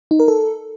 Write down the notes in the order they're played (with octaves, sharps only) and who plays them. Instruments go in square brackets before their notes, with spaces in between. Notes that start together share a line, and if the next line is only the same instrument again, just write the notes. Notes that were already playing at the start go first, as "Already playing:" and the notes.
[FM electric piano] D#4
A#4
A4